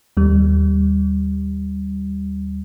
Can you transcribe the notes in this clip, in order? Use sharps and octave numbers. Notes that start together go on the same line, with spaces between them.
D#2 G3